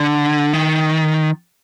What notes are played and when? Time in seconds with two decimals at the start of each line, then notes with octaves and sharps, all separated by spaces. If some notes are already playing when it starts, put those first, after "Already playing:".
Already playing: D3
0.53 D#3